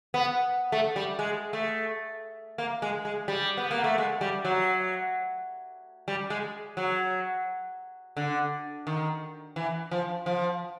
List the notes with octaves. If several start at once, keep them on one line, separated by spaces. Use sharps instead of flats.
B3
A3
G3
G#3
A3
A#3
G#3
G#3
G3
B3
A#3
A3
G#3
G3
F#3
G3
G#3
F#3
D3
D#3
E3
F3
F3